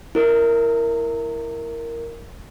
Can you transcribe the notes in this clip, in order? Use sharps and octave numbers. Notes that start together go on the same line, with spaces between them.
E4 A#4